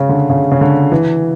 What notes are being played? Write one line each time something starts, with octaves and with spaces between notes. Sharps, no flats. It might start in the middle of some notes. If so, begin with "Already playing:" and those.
Already playing: C#3
D3
C#3
C#3
D3
E3